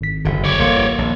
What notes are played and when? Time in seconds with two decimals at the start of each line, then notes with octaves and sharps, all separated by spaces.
0.01 G#1 B6
0.25 F#1 D3
0.44 C#5 D5
0.59 G1 F2 A#3 C6
0.98 A#1 D#2